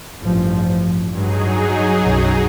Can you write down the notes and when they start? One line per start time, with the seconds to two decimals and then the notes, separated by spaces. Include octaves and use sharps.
0.21 A1 G2 F3
1.11 G2 F#3 D#4 G#4
2.02 B1 F#2